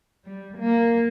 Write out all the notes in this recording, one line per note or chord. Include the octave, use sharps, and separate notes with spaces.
G3
A#3